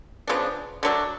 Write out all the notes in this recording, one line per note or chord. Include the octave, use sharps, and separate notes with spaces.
C#3 F3 B3 D4
D3 F#3 A3 D4